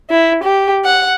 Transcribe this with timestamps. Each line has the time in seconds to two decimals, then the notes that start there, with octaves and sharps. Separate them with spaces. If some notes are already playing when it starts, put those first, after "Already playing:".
0.10 E4
0.44 G4
0.85 F#5